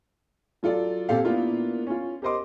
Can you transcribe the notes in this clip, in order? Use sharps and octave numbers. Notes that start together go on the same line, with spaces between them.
F#3 F4 A4 D5
A#2 C4 G4 A4 F5
A#3 B3 D4 E4 F4 A#4
C#4 F4
G4 A#4 C5 D#5 C6 D6